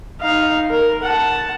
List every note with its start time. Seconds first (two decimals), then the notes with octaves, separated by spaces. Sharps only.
0.21 D#4 F5
0.70 A#4
1.03 F#5 A5